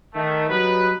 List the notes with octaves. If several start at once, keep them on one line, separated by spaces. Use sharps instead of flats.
D#3 A3
F#3 G3 B3 D#4 B4